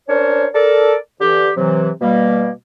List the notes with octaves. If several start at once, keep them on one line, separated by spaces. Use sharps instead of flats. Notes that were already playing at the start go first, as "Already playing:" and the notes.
C#4 D4 A#4 C5 C#5
A4 A#4 D5
D3 E3 G4
C3 E3 F#3
B2 G3 A#3